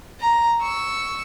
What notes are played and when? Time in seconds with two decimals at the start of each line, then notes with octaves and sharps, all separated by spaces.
0.20 A#5
0.61 C#6 E6